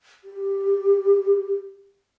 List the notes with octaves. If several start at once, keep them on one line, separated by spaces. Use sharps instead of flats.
G4